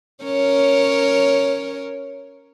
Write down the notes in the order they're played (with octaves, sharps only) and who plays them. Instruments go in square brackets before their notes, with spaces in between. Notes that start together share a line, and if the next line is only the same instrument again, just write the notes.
[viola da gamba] C#4 A#4 C#5